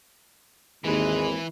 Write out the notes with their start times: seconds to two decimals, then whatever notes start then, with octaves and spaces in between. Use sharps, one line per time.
0.85 G#1 D#2 E3 G#3 B4